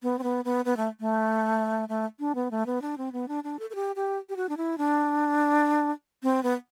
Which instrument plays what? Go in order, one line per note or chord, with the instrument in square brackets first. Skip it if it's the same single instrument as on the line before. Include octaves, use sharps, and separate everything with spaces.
[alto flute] B3
C4
B3
B3
B3
A3
A3
A3
D4
B3
A3
B3
D4
C4
B3
D4
D4
A4
A4
G4
G4
G4
F#4
D4
E4
D4
C4
B3